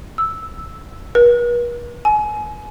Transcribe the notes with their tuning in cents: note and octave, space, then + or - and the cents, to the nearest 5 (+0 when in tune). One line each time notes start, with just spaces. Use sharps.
E6 -5
B4 -45
G#5 +30